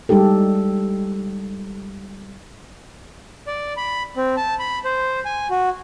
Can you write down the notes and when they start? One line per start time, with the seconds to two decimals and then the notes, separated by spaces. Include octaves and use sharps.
0.09 G3 G#3 D#4 G4 A4
3.47 D5
3.77 B5
4.17 C4
4.37 A5
4.60 B5
4.85 C5
5.25 G#5
5.50 F#4